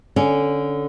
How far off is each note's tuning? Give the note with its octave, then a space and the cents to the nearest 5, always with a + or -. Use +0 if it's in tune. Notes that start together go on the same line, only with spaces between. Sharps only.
D3 -10 C#4 +0